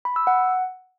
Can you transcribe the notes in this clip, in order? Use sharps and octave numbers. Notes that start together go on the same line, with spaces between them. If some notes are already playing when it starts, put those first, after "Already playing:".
B5
E6
F#5